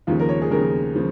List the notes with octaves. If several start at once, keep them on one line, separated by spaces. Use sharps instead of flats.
D#2 C#3 F3 F4
A#4
C#5
G#4
D#2 C#3 F3 A#4
C#3 F3